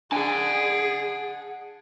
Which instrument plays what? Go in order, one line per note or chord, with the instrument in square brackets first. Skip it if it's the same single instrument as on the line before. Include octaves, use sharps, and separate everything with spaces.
[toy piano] D4 [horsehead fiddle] G#4 [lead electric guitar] F#5 A5